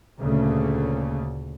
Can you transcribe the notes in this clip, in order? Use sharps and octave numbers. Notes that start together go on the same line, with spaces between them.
D2 A#2 C#3 A3